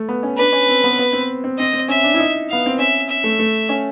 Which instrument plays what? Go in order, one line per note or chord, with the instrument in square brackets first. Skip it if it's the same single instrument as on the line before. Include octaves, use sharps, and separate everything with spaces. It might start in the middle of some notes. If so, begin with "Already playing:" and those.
Already playing: [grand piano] A3
B3
C#4
[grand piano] D4 [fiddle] B4
[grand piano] C#4
C4
B3
B3
C4
C4
[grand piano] C4 [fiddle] D#5
[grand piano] C4
[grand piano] C#4 [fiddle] E5
[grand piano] D4
E4
D#4
[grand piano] B3 [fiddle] F5
[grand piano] C4
[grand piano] C#4 [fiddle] E5
[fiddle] E5
[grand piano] A3
A3
C#4